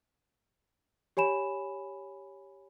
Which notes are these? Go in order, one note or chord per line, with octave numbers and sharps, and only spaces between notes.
G4 C#5 G#5 B5 E7